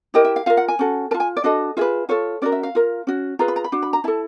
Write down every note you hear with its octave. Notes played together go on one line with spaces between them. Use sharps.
E4 G4 A#4 D#5
E5
F5
F4 A#4 F5
F#5
G#5
C#4 F#4 A4
A#4 A5
F4
G#5
D5
D4 F#4 A4 D#5
F4 G#4 B4 E5
F4 A4 C#5
C#4 F#4 A#4 D5
E5
F5
F4 A#4
C#4 F#4
F4 G#4 B4 A#5
B5
A#5
B5
D4 F#4
B5
A#5
E4 A4 A5